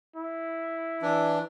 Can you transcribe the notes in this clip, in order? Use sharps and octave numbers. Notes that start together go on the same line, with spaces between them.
E4
E3 D4